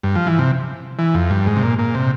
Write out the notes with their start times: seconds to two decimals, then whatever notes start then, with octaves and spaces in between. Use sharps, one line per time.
0.03 G2
0.15 F3
0.27 E3
0.39 C3
0.99 E3
1.14 F2
1.31 G2
1.46 G#2
1.56 C3
1.63 A#2
1.78 A#2
1.95 C3